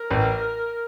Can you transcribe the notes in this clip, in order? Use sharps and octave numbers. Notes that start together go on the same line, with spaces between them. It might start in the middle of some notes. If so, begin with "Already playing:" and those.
Already playing: A#4
A1